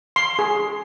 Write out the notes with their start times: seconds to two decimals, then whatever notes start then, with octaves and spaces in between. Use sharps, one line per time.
0.16 C6
0.39 G#4